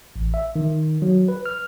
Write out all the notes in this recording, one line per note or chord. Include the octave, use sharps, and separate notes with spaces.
A1
E5
D#3
F#3
B4
F6